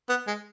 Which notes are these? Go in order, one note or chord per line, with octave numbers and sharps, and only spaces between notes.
B3
G#3